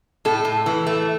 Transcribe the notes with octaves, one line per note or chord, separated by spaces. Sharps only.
A2 A4
A2
E3
A3